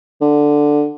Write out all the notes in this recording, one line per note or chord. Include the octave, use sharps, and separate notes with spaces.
D3